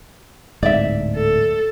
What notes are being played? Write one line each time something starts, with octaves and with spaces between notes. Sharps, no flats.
D1 G#2 D5 E5
A4